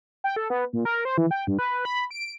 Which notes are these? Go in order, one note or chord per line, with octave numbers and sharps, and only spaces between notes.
G5
A4
B3
A#2
A#4
C5
E3
G5
G2
B4
B5
D7